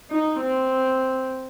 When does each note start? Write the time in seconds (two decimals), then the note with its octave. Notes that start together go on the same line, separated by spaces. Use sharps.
0.11 D#4
0.40 C4